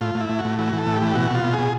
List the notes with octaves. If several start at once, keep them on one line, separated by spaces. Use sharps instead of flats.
A2 F4
A2
E4
A2
F#4
A2
E3 F#4
E3
A4
A2
G4
E3
B2 F#4
B2 F4
B2
G#4
B2